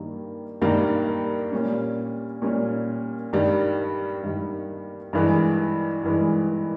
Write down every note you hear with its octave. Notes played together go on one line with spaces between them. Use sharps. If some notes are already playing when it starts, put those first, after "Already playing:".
Already playing: G2 D#3 G3 A#3
G2 D#3 G3 A#3
A#2 G3 C#4
A#2 G3 C#4
G2 D#3 G3
G2 D#3 G3
G2 E3 G#3
G2 E3 G#3